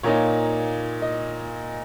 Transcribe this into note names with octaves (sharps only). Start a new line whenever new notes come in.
A#2 A#3 D#4 C#5
D#5